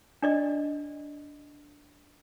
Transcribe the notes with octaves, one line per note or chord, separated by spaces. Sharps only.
D4 D5 D#5